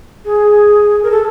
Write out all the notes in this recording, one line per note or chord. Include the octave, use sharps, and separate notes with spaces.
G#4
A#4
A4